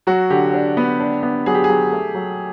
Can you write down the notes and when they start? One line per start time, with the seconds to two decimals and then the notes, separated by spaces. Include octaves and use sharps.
0.07 F#3 F#4
0.30 D3 G4
0.54 D4
0.77 B3
1.00 D4
1.23 B3
1.46 F#3 G#4
1.54 G4
1.64 F#3 G#4
1.92 A3
2.15 F#3